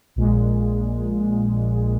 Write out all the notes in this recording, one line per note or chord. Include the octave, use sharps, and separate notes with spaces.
A#1 A#2 G#3